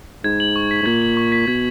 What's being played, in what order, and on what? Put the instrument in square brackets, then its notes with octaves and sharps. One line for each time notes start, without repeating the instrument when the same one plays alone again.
[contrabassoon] G#2 [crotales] G#6
[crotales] F#7
C#6
B6
[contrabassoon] G#2
[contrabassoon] A#2 [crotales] G#6
[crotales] F#7
C#6
B6
[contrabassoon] B2 [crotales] G#6